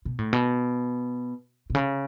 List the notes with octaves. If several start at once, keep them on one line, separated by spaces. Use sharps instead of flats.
B2
A2
B2
B2
C#3